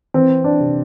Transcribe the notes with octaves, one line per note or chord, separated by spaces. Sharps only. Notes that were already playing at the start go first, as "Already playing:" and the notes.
E3 C4
D4
C3